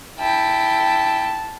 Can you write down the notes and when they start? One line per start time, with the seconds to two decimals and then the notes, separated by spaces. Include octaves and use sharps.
0.19 E4 G5 A5